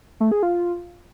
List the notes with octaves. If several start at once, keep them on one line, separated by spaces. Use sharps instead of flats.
A3
G#4
F4